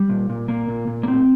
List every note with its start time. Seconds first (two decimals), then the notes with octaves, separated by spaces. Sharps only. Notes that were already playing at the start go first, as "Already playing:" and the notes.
Already playing: G3
0.09 A#2
0.30 A#2
0.48 A#2 A#3
0.68 A#2
0.87 A#2
1.03 A#3
1.07 A2 C4